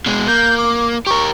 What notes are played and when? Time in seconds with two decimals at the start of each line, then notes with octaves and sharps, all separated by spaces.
0.06 B2 G#3
0.27 A#3 G6
0.58 D6
1.07 G4 A#4 C#6